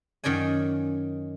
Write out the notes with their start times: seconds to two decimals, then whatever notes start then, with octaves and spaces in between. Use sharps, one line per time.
0.24 F#2 D#3 C#4 D5 G#5